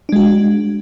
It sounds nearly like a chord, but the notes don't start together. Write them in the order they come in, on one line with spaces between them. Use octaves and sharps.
D4 G#3 F#4